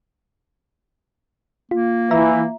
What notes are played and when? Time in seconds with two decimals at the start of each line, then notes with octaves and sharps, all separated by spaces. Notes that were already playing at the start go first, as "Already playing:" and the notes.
1.71 A#3 F4
2.11 E3 E5 A#5